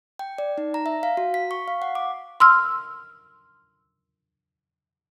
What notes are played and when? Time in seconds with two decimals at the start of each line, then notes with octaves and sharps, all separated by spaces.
0.19 G5
0.38 D5
0.58 D#4
0.74 A#5
0.86 E5
1.03 F5
1.17 F#4
1.34 B6
1.51 C#6
1.68 F5
1.82 F#5
1.95 D6
2.40 C6 E6 F6